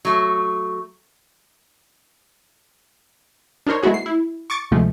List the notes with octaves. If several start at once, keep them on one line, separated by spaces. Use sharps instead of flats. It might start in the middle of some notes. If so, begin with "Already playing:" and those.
F#3 A3
D4 D#4 A#4 C5 C#5
G#3 A3 B3 E4 F#4 G#4
C7
E4
C#6 D6 A6 C#7
D2 C3 F3 G#3 A3